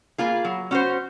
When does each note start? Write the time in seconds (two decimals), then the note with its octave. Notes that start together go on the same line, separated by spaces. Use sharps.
0.18 A#3 F4 G#4
0.45 F#3
0.71 C#4 F#4 C5